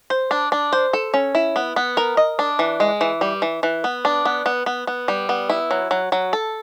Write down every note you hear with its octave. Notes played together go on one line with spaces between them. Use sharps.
C5
D4
D4
C5
A4
C#4
E4
B3
B3
A#4
D#5
D4
E3
G#3
E3
G3
E3
E3
B3
D4
B3
B3
B3
B3
G3
B3
E4
F#3
F#3
F#3
A4